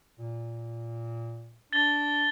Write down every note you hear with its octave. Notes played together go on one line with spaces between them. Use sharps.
A#2
D4 A6 G7